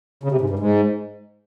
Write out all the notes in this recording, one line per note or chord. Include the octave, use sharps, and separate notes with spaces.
C#3
C3
G#2
G2
G#2